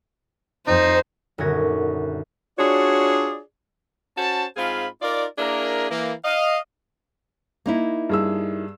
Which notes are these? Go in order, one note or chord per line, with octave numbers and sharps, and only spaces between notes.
F2 D#4 C5
D#1 F#2 D3 F#4 G#6 A#6
D4 F4 F#4 G#4 C#5 D5
C#4 F#4 C5 A5
G#2 C4 F4 G#4 F5 B5
D#4 F4 A#4 D5
A#3 D4 E4 G#4 A#4
E3 A#3
D#5 F5
A#3 D#4 E4
G2 G#4 E6